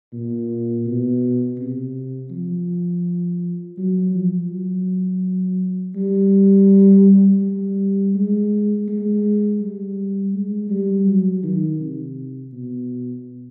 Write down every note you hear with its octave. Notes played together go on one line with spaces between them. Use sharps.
A#2
B2
C3
F3
F#3
F3
F#3
G3
G3
G#3
G#3
G3
G#3
G3
F#3
D#3
C3
B2